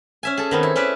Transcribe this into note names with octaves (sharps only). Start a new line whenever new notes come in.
C#4 E5 G#5
G#4 A4
D#3 B3 C4
E4
C#4 B4 D5 E5